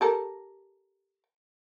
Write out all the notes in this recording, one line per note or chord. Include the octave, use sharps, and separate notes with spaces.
G4 A4 A#4